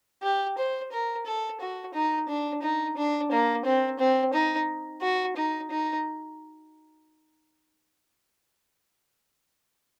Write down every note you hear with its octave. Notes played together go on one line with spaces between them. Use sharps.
G4
C5
A#4
A4
F#4
D#4
D4
D#4
D4
A#3
C4
C4
D#4
F#4
D#4
D#4